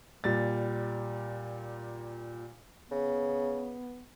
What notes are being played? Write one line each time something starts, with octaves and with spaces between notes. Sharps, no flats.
A#2 G3 A6
C#3 B3